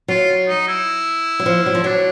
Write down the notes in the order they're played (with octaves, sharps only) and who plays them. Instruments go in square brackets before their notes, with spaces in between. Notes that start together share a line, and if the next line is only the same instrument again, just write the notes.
[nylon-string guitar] F#3 [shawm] F4
[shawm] D#4
E4
[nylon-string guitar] F#3
F3
F#3
F3
[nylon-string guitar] F#3 [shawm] D4